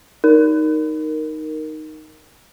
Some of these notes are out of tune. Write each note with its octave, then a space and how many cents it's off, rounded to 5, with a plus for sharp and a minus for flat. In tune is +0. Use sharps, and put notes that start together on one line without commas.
D#4 +0 A#4 +0